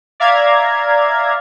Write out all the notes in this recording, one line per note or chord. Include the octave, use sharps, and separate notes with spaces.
D5 E5 F5 A#5 G#6